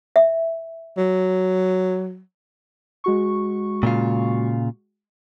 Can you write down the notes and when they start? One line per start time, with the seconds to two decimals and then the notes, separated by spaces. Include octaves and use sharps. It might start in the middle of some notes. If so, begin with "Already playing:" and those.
0.16 E5
0.97 F#3
3.04 G#3 F#4 C#6
3.83 A#2 C#3 F4